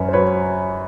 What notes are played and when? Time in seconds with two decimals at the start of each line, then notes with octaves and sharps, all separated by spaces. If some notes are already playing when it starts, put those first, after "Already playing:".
Already playing: F#2 B4 C#5
0.08 C5
0.13 F#3 B4 C#5